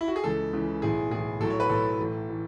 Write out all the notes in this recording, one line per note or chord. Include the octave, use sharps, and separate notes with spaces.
E4
F#4
G#4
C#2 C#3 E3 A4
C#2 C#3 E3
B1 A2 E3 G#4
B1 A2 E3 G#4
B1 A2 F#3 A4
C#5
B4
B1 A2 F#3 A4
A1 A2 E3
A2 E3